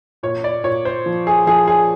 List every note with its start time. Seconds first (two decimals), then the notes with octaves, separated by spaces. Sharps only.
0.23 A#2 C#5
0.44 D5
0.64 A#2 C#5
0.85 C5
1.06 F3
1.27 G#4
1.47 F3 G#4
1.68 G#4